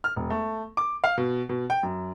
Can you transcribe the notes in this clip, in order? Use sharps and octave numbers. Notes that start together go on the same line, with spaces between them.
F6
E1
A3
D6
F5
B2
B2
G5
F#2